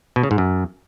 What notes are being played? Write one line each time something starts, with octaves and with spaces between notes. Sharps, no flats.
B2
C#3
G#2
F#2